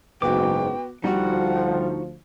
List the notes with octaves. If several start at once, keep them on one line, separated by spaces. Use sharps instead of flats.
F#1 G#2 B3 F#4 G5 D6
D2 F3 G3 D#4 F#4 F#5